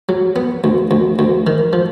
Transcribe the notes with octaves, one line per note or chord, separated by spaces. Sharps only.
F#3
B3
D2
D2
D2
D#3
F3